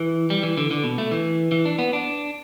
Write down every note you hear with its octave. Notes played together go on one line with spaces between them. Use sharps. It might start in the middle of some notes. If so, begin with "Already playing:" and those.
Already playing: E3
G3
E3
D3
D3
B2
A3
E3
E3
D4
B3
D4